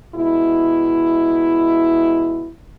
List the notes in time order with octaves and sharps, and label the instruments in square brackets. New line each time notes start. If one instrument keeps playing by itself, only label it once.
[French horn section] B2 G#3 E4